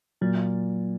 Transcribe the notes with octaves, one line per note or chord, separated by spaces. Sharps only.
A#2 F#3